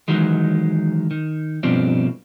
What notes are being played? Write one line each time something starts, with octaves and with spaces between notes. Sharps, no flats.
D#3 E3 F#3 G#3
D#3
G2 B2 F3 C4 D4